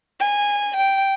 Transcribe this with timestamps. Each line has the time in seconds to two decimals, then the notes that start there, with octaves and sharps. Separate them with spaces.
0.20 G#5
0.76 G5